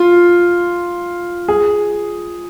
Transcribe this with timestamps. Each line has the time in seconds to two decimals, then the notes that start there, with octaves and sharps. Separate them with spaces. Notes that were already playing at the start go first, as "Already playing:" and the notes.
Already playing: F4
1.48 G#4